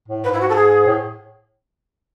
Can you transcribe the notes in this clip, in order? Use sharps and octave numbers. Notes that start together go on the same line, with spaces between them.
A2
G#2 B4
E4
F#4
A4
G#4
A2